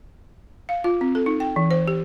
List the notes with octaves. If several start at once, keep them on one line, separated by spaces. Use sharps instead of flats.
F5
F4
C4
A4
D#4
G5
E3
C5
G4